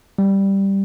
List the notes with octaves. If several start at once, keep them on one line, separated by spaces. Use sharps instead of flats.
G3